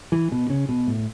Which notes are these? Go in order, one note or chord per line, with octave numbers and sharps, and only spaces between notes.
E3
B2
C#3
B2
A2